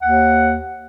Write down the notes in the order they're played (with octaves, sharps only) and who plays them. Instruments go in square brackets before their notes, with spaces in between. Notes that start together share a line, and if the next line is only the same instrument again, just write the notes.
[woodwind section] D#2 F#5